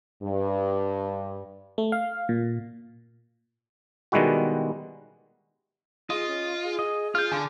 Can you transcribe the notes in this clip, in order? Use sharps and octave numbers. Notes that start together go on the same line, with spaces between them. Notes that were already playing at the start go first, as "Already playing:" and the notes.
G2
A3
F5
A#2
B2 D#3 G3 G#3 E4 F#4
F4 G#4 D#5
C#4
G#4
D#5
F4 F6 G6
D3 G#5 A5